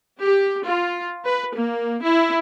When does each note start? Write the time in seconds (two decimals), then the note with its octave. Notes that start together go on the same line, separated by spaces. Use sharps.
0.20 G4
0.67 F4
1.25 B4
1.55 A#3
2.02 E4